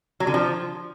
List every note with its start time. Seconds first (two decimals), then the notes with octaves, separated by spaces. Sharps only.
0.20 F#3
0.27 D3
0.34 F3